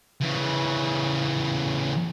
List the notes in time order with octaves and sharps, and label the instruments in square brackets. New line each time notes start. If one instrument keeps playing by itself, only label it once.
[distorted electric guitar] C#3 E3